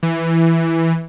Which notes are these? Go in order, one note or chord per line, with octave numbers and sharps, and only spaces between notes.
E3